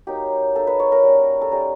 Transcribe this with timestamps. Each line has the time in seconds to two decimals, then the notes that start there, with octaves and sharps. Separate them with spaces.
0.07 F#3 A#3 D#4 G4
0.55 F#3 A#3 D#4 A4
0.67 B4
0.80 C#5
0.92 A#4
1.04 G3 A#3 C#4
1.41 A4
1.52 G3 A#3 C#4 A#4